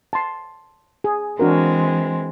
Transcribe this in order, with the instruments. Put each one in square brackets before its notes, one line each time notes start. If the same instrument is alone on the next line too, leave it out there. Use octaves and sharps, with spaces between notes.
[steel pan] A5 C6
G#4
[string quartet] E3 G#3 C4 [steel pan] D4 F#4 A#4